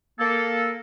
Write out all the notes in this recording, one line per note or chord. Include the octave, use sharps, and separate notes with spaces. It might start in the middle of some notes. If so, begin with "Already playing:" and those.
A#3 A4